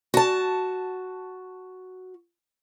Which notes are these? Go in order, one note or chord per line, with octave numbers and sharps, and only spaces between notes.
F#4 A5